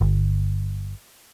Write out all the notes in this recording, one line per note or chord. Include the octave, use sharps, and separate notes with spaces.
G1